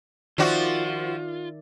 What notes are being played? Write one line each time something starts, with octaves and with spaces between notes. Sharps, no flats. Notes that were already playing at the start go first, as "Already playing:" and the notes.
D#3 F3 F4 F#4 D5 E5